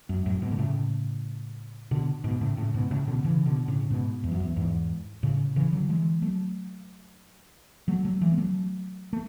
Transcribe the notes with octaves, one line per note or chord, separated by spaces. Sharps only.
F#2
F#2 A2
G#2 B2
D3
A2 C#3
B2 D3
G#2 B2
A2 C#3
A2 C#3
G#2 B2
A2 C#3
B2 D3
D3
C#3 E3
B2 D3
A2 C#3
G#2 B2
E2
F#2
E2
E2 G#2
A2 C#3
C#3 E3
D3 F#3
E3 G#3
F#3 A3
F#3 A3
F#3 A3
E3 G#3
B3
F#3 A3
A3